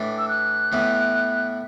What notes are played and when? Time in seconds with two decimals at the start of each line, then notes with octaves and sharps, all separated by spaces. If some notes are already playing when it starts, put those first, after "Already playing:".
Already playing: A2 E3 D4
0.18 E6
0.29 F#6
0.72 A2 E3 B3 E4